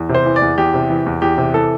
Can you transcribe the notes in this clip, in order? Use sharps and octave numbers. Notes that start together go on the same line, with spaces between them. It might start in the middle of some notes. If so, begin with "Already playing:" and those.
Already playing: E2
C3
C5
E3
D5
E2
E2 G4
C3
E3
E2
E2 G4
C3
E3 A4